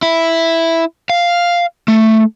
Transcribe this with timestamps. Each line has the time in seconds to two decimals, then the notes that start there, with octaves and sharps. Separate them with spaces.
0.02 E4
1.10 F5
1.88 A3